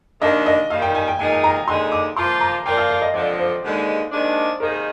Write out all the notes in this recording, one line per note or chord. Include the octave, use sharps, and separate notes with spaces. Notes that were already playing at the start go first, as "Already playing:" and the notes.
D#2 D#3 A#3 D4 D#5
D#5
D#2 D#3 G3 A#3 D#4 F5
G5
G#5
G5
A#2 G#3 D#4 A#4 G#5
G#5
A#5
D#2 D3 G#3 D#4 G#4 C6
D6
F3 A#3 F4 C5 C6
A#5
F3 A#3 F4 A#4 D5 G5
F5
F5
D#5
F2 D3 F3 D5
C5
D#2 D3 G#3
D#2 D#3 G#3 D4
C3 D#3 A#3 D#4 G#4 A#4